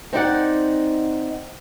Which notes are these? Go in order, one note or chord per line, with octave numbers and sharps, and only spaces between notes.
C4 D#4 D5 F#5